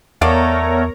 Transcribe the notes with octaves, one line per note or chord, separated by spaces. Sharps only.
E2 A3 B3 A#4 C#5 D5 F5 A#5